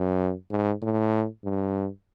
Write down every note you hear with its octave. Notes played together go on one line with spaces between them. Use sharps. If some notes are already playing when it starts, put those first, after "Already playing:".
Already playing: F#2
G#2
A2
G2